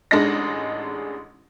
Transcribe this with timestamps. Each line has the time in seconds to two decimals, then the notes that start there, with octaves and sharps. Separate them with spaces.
0.11 A1 G#3 D4 D#4 D#5 A#6